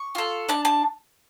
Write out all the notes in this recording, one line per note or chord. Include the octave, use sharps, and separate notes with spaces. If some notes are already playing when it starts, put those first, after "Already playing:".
Already playing: C#6
F4 A4
D4 A5
A5